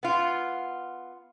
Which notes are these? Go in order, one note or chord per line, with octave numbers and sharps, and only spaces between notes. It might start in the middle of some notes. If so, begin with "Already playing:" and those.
B3 F4